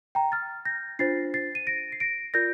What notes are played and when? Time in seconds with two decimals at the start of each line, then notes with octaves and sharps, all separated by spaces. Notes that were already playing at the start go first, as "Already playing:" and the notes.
0.15 G5 A#5
0.32 F6 A6
0.65 G6 A#6
0.99 D4 F4 C5 A6 C7
1.34 A6 C7
1.55 D#7
1.67 A#6 D7
1.92 C7
2.00 A#6 D7
2.34 F4 A#4 D5 G6 A#6